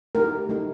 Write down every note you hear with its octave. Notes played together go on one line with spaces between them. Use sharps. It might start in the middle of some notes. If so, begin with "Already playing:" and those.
A3 D#4 G4 A#4
A3 D#4 G4